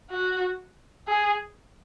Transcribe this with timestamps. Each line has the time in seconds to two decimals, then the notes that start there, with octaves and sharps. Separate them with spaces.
0.11 F#4
1.08 G#4